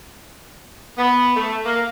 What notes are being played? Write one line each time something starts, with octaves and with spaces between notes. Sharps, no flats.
B3
A3
A#3